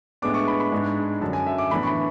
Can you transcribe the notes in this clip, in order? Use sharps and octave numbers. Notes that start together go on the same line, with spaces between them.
A2 G#3 B3 D4 D6
C#6
B5
B5
G#2 G#3 D4
F#2 D3 F#3 A5
G#5
E5
D6
A2 E3 B3 D4 B5
C#6
B5